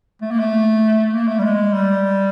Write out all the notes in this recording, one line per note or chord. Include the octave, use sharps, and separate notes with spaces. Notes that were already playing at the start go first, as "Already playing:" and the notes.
A3
A#3
A3
A#3
A3
G3
G#3
G3